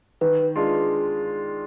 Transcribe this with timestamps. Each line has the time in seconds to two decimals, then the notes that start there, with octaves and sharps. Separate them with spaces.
0.21 D#3 B4
0.56 G#3 D4 F4